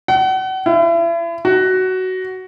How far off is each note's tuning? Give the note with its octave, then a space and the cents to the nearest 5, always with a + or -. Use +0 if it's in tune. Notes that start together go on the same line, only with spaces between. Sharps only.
F#5 +35
E4 +35
F#4 +10